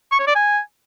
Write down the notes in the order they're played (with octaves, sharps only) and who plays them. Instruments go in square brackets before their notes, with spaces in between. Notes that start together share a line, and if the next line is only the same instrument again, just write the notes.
[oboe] C#6
C#5
D5
G#5